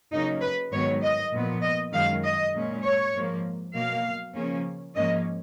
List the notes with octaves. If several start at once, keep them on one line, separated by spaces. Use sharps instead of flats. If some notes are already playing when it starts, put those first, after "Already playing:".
C#3 F#3 A#3 C#4 D#4
B4
G#2 D#3 F#3 B3 C#5
D#5
A#2 F3 B3
D#5
F#2 D#3 G#3 F5
D#5
A#2 G#3 C#4
C#5
G#2 F3 A#3
B2 F#3 A#3 F5
C#3 F3 A#3 C#4
G#2 F3 A#3 C#4 D#5